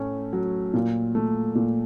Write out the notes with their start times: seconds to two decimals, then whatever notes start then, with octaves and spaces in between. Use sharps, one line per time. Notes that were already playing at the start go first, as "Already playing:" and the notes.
Already playing: A2 A3 C#4
0.33 F#3
0.74 A#2
1.15 A3
1.55 A#2